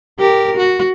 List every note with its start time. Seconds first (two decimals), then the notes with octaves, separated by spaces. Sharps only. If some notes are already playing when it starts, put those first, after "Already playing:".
0.19 G4 A#4
0.57 F#4